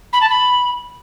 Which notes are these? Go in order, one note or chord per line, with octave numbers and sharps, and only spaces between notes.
B5
A5
B5